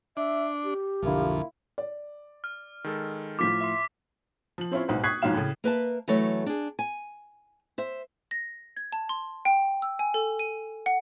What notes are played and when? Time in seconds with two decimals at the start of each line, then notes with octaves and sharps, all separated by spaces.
0.17 D4 E5
0.64 G4
1.03 B1 F2 D3 A#3 E4 F4
1.78 D5
2.44 F6
2.84 D#3 G#3 A4
3.39 A2 F3 F4 D6 B6
3.61 E5 C6
4.58 F3 F#7
4.71 C4 C#4 E4 F4 C5 C#5
4.88 B1 G#2 B2 F#4 C5
5.04 C#6 D#6 F#6 G#6 B6 C7
5.22 B1 G#2 F3 F#3 F5 E7
5.34 A2 C#3
5.64 A#3 B4 E5 A5
6.08 E3 F#3 A3 A4 C#5
6.46 D4 G#4
6.79 G#5
7.78 C5 E5
8.31 A#6
8.76 G#6
8.92 A5
9.09 C6
9.45 G5
9.82 E6
9.99 G#5
10.14 A4
10.39 D#7
10.86 F#5